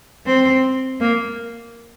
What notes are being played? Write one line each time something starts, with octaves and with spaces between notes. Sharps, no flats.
C4
A#3